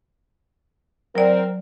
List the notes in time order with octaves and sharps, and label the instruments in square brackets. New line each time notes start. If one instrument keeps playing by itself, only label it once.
[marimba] F#3 D5 [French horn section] C4 A#4